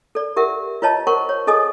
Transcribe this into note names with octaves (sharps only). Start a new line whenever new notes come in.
A4 D5
G4 A#4 E5 F#5
F4 B4 C#5 D#5 A5
A#4 C5 F#5 C#6
C#5
G#4 A4 D#5 G#5 D#6